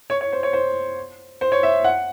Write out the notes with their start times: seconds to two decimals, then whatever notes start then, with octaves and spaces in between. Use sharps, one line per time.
0.10 C#5
0.21 C#5
0.32 C5
0.43 C#5
0.53 C5
1.41 C5
1.52 C#5
1.63 E5
1.84 F#5